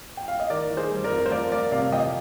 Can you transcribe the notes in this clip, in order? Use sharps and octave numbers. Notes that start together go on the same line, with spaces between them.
G5
F5
D#5
D#3 A#4 D5
D#3
G#4 C5
G3
A#4 D5
F2
C5
F3 A#4 D5
F3 A#4 D5
C3 D5 F5
F3 D#5 G5